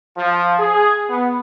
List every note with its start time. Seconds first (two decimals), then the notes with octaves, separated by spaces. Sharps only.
0.16 F3
0.57 G#4
1.09 B3